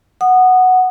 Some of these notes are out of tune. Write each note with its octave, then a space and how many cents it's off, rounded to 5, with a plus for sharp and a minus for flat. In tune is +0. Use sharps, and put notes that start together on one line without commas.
F#5 +0 D#6 -20